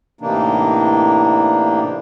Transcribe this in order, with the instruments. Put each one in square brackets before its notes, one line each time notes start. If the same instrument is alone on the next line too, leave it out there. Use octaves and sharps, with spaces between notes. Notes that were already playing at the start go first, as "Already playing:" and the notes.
[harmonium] A2 C3 E3 A#3 D4 D#4